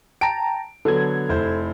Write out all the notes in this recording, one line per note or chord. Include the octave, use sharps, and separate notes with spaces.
G5 A5 A#5 D7
D3 F#3 B3 A4 G#6
F1 E4 C5